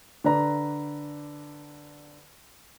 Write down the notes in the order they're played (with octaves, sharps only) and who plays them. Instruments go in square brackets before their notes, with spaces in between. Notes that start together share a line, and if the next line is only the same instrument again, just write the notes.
[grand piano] D3 B4 D5 A#5